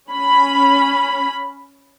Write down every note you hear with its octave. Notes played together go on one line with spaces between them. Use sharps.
C#4 B5